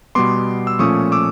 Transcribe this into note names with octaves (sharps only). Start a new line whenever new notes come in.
B2 G3 B3 C6 D6
E6
A#2 F3 A3 C#4 C#6 D#6
D6 E6